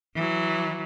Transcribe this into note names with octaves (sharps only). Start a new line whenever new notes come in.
E3 F#3